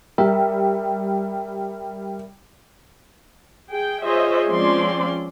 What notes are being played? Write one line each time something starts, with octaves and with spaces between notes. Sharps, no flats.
G3 A#4 E5
G#4 G5
F4 G#4 C5 C#5 D#5 E5
F3 G#3 C4 C#4 D5 C6